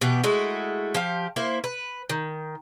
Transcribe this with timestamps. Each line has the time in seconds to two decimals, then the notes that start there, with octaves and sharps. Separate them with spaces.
0.01 B2 E3 B3 G4
0.24 G#3 A3 E4 F#4
0.94 F3 G4 F5
1.36 A#3 E4 C5
1.64 B4
2.10 D#3